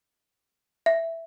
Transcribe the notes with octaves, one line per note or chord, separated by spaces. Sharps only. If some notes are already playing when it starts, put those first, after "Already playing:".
E5